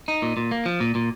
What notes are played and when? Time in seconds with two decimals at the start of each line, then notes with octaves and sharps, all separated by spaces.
0.08 D#4
0.22 A#2
0.37 A#2
0.51 A#3
0.66 F3
0.80 A#2
0.95 A#2